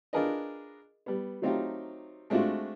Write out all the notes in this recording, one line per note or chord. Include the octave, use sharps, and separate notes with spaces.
D4 F4 G#4 A#4 B4 D#5
G3 B3
F#3 A3 C4 D#4 F4 G4
G#3 A3 C4 D4 F4 F#4